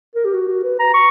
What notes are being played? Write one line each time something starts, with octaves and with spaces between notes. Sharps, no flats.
A#4
G4
F#4
F#4
B4
A#5
C#6